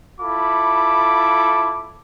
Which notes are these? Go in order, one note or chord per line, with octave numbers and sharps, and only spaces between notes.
E4 F4 A4 B5 D6